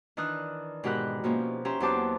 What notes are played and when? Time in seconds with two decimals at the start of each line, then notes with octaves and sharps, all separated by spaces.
0.17 D#3 E3 D4 D#6 F6 F#6
0.84 G#2 B2 G4 A#4 B5 F#6
1.24 B2 F3 A#3 C#4
1.65 C#4 G4 E5 A#5 C6
1.80 E2 F#3 G4 C5 A5 D6